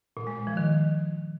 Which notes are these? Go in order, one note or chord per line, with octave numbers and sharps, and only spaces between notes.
A#2
G#3
A#2
F3
D#3